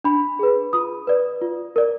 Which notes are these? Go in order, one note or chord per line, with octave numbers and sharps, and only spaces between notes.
D4 B5
G#4 B4
F4 D#6
B4 D5
F4
A#4 D5